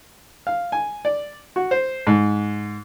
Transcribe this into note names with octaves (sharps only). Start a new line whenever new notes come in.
F5
G#5
D5
F#4
C5
G#2